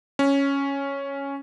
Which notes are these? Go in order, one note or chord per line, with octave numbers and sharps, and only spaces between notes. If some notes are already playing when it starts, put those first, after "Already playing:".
C#4